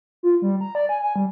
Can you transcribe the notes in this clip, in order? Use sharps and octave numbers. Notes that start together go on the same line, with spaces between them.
F4
G3
A#5
D5
G#5
G#5
G3